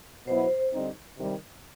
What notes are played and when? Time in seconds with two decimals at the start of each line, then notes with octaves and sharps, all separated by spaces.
0.27 B2 F#3 B3 E4 C5
0.72 D3 G3 C4 D#4
1.18 C3 D#3 G3